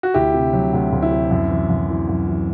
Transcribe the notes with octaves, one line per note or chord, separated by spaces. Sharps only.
F#4
D2 E4 G4
C3
F#3
D2
D2
E4
C3
F#2
E3
F#2
E3
F#2
E3